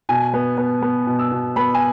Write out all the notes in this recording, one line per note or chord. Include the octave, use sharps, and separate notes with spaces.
B2 G#5
B3
B3
B3
B2
E6
B2
B3 B5
G#5